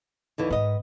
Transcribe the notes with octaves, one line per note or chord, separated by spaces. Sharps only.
D#2 D3 E3
G#2 D#3 B3 D#5